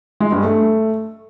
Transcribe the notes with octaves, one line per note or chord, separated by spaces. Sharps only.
G#3
G2
A3